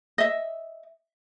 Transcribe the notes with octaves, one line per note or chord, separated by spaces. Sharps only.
D#5 E5